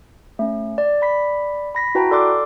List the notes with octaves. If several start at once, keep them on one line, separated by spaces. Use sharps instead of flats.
A3 C#4
D5
D5 B5 B6
B5 A#6 B6
E4 F#4 B4 G5 A5 A#5
A4 D5 C6 D6 F#6